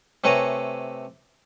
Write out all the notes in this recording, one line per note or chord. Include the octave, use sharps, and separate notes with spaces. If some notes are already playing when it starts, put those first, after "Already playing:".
C3 A3 B4 C#5 G#5 A#5